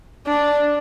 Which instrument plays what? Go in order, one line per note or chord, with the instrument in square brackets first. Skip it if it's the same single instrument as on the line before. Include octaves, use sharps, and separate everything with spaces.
[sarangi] D4